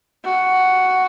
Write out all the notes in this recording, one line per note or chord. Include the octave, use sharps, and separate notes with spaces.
F#4